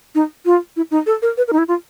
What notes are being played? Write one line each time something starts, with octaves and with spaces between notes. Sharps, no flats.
D#4
F4
E4
D#4
A4
A#4
B4
A#4
D#4
E4
F4